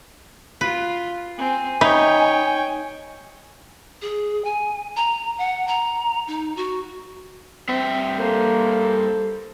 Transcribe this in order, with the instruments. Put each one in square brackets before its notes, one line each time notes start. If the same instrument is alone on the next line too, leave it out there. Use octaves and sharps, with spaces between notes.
[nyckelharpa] F4 [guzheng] B4
[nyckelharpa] C4 [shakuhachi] G#5
[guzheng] D#4 [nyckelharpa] C#5 G5 [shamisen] E5 B5
[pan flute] G#4
G#5
A#5
F#5
A#5
D#4
F#4
[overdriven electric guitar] G2 E5 [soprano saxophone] C4
[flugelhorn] A#3 [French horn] A4 [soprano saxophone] C5